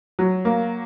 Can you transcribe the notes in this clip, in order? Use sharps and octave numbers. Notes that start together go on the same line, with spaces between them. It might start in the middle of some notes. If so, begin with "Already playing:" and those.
F#3
A#3